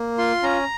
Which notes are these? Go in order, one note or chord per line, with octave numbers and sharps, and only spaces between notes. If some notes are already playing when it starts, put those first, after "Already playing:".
Already playing: A#3
F4 C6
C#4 A#5